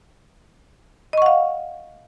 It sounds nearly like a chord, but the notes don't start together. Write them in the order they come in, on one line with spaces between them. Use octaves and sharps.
D#5 C#6 F#5 F5